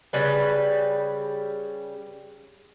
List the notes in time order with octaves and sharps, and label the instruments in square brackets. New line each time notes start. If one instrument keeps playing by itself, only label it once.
[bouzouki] C#3 G3 B4